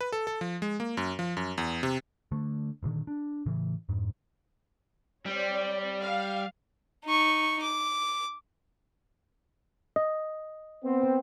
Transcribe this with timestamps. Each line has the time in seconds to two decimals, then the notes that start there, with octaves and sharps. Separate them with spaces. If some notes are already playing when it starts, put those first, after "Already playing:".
0.01 B4
0.12 A4
0.27 A4
0.41 F3
0.62 G#3
0.80 A#3
0.97 F#2
1.19 F3
1.37 F#2
1.58 E2
1.83 C3
2.32 D3 A3
2.83 A1 A#2 D3 D#3
3.07 D4
3.46 A2 C#3 E3
3.89 F2 G#2
5.26 G3 C4 C#5 D5
6.02 F5
7.05 D#4 C#6
7.62 D6
9.96 D#5
10.84 B3 C4